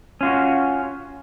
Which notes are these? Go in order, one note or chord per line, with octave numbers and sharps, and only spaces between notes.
C#4 F4 F#4